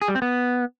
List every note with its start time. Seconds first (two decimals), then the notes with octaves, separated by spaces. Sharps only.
0.02 G#4
0.08 G3
0.15 C4
0.22 B3